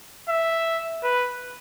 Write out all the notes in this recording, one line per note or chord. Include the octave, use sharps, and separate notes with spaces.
E5
B4